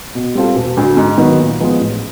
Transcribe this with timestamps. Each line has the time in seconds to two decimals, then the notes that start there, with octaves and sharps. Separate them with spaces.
0.15 B2
0.35 G3 C4 F4 A4
0.55 E1
0.77 D2 D3
0.97 G#2
1.18 D#3 F#3 B3
1.40 A#2
1.60 F3 G#3 B3
1.80 A1